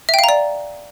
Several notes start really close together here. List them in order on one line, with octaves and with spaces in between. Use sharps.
E5 G5 F5 A#5 D5